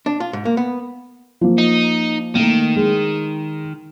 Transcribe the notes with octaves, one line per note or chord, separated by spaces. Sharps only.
D4
F4
G#2
A#3
B3
F3 A#3
D#4
D#3 A3 A#3
G#3